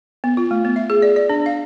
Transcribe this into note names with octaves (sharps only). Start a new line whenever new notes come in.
B3
F4
A3
B3
E5
G#4
D5
D5
D4
F5